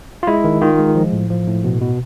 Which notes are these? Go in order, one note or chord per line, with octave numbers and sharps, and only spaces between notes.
F4
G#3 E4
D#3
D#3 F4
G#3
F3
A2
F3
A2
B2
B2